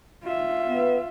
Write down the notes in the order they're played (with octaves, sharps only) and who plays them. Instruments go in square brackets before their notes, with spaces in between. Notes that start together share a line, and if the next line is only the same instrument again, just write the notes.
[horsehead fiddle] F4 E5
[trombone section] B3